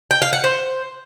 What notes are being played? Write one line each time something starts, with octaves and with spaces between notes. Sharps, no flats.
G5
F5
F#5
C5